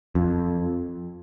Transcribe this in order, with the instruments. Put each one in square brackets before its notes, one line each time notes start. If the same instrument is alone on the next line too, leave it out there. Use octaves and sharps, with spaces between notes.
[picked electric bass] F2